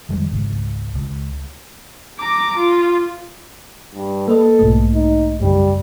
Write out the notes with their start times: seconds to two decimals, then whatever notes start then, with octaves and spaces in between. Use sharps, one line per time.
0.09 F2 D#3 G3 G#3
0.31 G#1 C#2
0.95 C#2
2.19 A#5 D6
2.57 F4
3.94 G2
4.28 A#3 A4 B4 D#5
4.59 B1 G#2 A3
4.94 D#4
5.41 F#2 C#3 G3